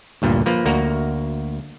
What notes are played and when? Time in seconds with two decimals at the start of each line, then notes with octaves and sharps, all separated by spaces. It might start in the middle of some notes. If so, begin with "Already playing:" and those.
0.22 D2 G2 A#2
0.46 F3 A#3 B4
0.65 D2 A#3 F#4 A#4